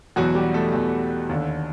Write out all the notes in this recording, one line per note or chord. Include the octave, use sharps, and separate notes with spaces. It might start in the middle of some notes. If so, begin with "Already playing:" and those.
E2 B2 F#3 F#4
G3 G4
A3 A4
E2 B2
D#2 D3